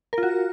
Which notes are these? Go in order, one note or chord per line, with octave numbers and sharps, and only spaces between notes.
A#4
F4
F#4